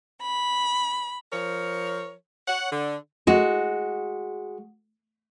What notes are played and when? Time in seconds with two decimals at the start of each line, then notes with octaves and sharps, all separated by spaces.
0.20 B5
1.33 F3 A#4 C#5
2.48 C#5 F#5
2.71 D3
3.27 G#3 F#4